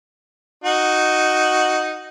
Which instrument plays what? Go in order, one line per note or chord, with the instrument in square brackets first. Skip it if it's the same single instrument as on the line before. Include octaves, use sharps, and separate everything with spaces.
[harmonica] D#4 F#4